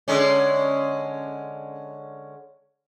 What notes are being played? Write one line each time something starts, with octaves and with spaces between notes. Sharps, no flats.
D3 G#3 C#4